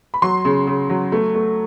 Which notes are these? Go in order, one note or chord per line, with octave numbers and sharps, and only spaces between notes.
B5
F#3 C6
C#3
C#3
F#3
A3
A3